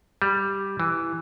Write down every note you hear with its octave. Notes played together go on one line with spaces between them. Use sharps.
G3
E3